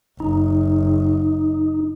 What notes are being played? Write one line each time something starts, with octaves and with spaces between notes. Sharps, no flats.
F#1 D#4